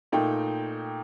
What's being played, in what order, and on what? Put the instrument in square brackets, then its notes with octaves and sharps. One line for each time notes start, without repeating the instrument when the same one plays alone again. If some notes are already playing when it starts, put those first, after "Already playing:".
[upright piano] A#2 A3 D#4 G5